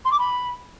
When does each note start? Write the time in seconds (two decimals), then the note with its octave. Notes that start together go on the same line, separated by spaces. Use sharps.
0.04 C6
0.11 D6
0.18 B5